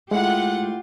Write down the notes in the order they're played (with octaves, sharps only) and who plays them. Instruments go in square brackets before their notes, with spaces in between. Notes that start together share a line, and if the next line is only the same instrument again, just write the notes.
[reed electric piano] G#3 [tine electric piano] A3 E4 [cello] F4 G4 [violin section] F#5